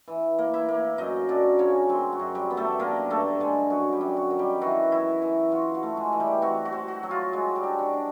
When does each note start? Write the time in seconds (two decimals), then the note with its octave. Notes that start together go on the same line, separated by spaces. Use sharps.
0.08 E3
0.38 A#3
0.54 E4 E5
0.69 A#3
0.98 F#2 D#4 D#5
1.29 F#2 D4 D5
1.59 C#3 C#4 C#5
1.89 F#2 C4 C5
2.13 F#4
2.19 F#2
2.35 G3 G4
2.50 B3
2.57 A3 A4
2.79 D3 A#3 A#4
3.10 G2 A3 A4
3.40 D3 G#3 G#4
3.70 F#2 F#4
3.93 G3 G4
4.01 F#2
4.17 F#4
4.31 D#3
4.39 G3 G4
4.61 E3 F#4
4.92 E4
5.22 E3
5.52 F4 F#4
5.75 F#4
5.83 A3
5.97 G#3 G#4
6.13 E3
6.20 G3 G4
6.42 C4 F#4
6.65 F#4
6.72 C4
6.88 F#4
7.03 F#3
7.11 F4
7.33 G#3 F#4
7.55 G3 G4
7.63 D4
7.79 F#4
7.93 D4